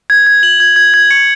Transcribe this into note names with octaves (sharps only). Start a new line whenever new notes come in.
G#6
G#6
F#7
G#6
G#6
G#6
C#7